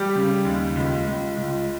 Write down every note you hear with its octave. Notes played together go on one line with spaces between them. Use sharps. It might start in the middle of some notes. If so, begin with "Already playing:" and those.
Already playing: G3 G4
C#3
D#2
C#2
C#2
C#2